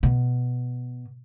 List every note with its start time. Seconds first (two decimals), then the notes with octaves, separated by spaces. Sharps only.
0.03 B2